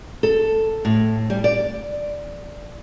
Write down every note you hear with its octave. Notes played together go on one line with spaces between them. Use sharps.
A4
A2
G3
D5